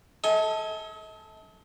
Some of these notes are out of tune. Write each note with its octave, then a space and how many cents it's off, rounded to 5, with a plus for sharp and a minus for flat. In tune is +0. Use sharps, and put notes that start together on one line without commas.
A4 +0 D#5 +45 G#5 +0